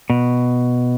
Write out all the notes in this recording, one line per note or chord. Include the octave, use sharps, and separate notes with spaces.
B2